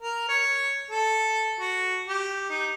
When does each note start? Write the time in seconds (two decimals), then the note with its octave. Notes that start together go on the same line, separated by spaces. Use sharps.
0.01 A#4
0.29 C#5
0.90 A4
1.60 F#4
2.08 G4
2.50 D#4